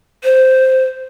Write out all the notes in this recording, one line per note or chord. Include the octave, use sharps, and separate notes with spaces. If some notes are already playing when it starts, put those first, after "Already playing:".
C5